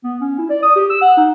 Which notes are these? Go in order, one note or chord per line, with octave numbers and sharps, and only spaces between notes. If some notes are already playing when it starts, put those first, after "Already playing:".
B3
C#4
E4
D5
D#6
G4
E6
F#5
D#4